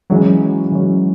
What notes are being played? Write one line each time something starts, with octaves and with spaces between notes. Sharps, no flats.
E3 F#3 G#3 C#4 F#4
E3 G#3 C#4 F#4